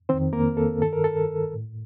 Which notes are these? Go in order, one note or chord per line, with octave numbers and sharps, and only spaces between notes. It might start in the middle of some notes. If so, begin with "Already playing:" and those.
F2 D#3 C4 C5
A#3 A#4
A4
G2 D#3 A4
A#4
A4
A2